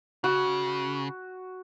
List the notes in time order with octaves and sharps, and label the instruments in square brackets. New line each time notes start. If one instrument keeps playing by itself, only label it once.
[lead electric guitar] C#3 [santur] F#4